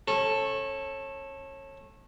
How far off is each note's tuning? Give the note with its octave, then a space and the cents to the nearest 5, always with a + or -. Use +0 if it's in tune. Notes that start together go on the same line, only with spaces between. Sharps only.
C#4 -25 A4 +0